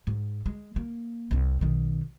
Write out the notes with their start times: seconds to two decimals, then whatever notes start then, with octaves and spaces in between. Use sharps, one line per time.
0.07 G#2
0.46 G#3
0.76 A#3
1.31 C2 C4
1.61 B1 D#3